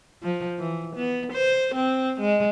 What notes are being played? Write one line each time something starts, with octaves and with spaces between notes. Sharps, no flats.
F3
E3
B3
C5
C4
G#3